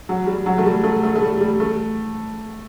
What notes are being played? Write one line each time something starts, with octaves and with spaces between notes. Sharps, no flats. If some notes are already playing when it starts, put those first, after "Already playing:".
F#3
G3
F#3
A3
G3
A3
A3
A3
G3
G3
A3